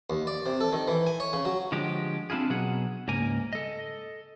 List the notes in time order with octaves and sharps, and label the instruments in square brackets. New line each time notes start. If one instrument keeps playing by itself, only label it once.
[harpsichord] D#2
D5
C3
A4
D#3
E3
G#5
C#5
C#3
F#3
[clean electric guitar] D3 F3 G#3 G4
C4 D4 E4 F4 G#4
B2 F#3 G#4 F#5
C#2 G#2 A#3 A#4 G#5
A4 D#5